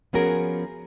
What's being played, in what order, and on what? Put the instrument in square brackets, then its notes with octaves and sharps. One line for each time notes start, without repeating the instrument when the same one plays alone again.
[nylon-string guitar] F3 B3 C#4 F#4 G#4 A#4